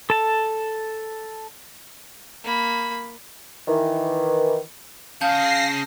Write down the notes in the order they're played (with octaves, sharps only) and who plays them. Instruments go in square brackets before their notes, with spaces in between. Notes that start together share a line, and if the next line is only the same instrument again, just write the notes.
[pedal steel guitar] A4 A5
[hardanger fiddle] A#3 B5
[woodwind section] D#3 E3
[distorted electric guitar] C#3 G#4 [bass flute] F5 [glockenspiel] A5 G6 [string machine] A#6 C7